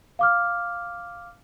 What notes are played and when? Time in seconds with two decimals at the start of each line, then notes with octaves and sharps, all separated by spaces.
0.19 F5 D6 F6